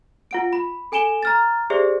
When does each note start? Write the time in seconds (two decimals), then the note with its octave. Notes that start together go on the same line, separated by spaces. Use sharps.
0.31 F4 F#5 D7
0.53 B5
0.92 A4 G#5 D7 E7 G7
1.23 A#5 F6 A6
1.70 G4 G#4 C5 D5 E5